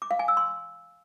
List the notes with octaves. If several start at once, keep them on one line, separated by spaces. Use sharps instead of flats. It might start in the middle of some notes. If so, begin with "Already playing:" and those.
D6
F5
G#5
E6
C6